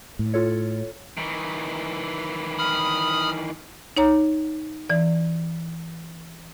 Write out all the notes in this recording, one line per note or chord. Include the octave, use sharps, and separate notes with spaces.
A2
F4 A4 C#5
D#3 E3
B5 D#6 F6
D#4 C#5 A#5
E3 D5